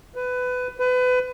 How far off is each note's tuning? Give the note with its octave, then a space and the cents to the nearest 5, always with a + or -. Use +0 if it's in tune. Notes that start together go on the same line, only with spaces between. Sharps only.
B4 +20
B4 +30